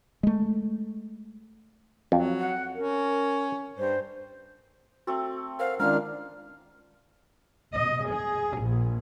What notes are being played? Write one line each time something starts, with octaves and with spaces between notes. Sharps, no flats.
G#3 A3
F2 F#3
F#5
C#4 A#4
G2 C5
A3 C4 F#4
A#4 C5 F5 F#5
D#3 G#3 C#4 D4 F4 A#4 F6
D#5
G#4
A#1